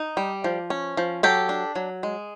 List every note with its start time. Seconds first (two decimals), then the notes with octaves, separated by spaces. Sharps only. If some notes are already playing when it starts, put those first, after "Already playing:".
Already playing: D#4
0.17 G3
0.44 F3
0.70 C#4
0.97 F3
1.23 F#3 G4 A4
1.49 D4
1.76 F#3
2.03 G#3